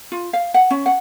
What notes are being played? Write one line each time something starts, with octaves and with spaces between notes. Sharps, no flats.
F4
F5
F#5
C#4
F#5